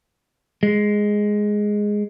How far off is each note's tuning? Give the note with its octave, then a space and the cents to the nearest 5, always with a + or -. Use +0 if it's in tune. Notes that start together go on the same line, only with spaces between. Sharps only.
G#3 +0